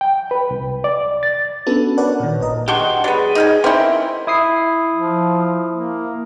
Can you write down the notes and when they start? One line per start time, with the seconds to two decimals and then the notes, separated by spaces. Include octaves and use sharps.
0.01 G5
0.31 B4
0.51 C2
0.84 D5
1.23 A6
1.67 B3 C#4 D4 F#4 A4 B4
1.98 A#4 B4 C#5 D5 F#5 A5
2.20 A#2 D#3
2.40 G#1 A#2 B4 D#5 A#5
2.68 G#3 D4 F#4 G4 C6 C#6
3.04 F#3 B3 G#4 B4 D5
3.35 D#4 F5 G#5
3.64 G#3 C4 C#4 E4 A#4 E5 G5
4.27 E4 D#6 C7
4.95 F3
5.71 A#3